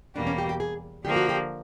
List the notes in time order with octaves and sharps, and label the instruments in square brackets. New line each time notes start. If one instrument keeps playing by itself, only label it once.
[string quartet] E2 B2 G3 A#3 [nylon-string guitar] D4
[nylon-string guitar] C#4
G4
G4
G#4
[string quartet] D3 F3 A#3 [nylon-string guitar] G4
[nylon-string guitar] F#4
G4